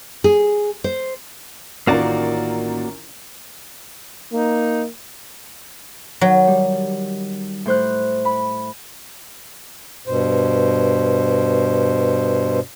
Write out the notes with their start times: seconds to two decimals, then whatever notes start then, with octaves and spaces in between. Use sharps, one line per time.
0.24 G#4
0.84 C5
1.87 A1 D#3 A#3 C#4 F4 F#4 A#4 D5
4.33 A#3 D#4
6.21 D#3 F#3
6.47 G3
7.66 A2 C5 F#6
8.25 B5
10.07 G2 B2 C5